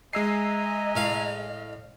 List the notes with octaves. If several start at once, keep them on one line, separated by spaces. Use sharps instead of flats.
G#3 D#5 E5 G#5 A#5 E6 C7
A2 F5